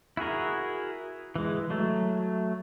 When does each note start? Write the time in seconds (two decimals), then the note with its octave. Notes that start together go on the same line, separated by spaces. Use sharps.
0.17 E4 F#4 G#4 A#4
1.36 E3 G#3
1.70 F#3 A3